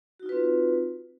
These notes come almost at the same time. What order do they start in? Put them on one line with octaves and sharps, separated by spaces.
F#4 D#4 F4 B4 C4